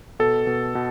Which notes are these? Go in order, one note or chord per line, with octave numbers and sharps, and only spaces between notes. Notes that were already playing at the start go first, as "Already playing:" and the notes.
B2 A4
B2
B2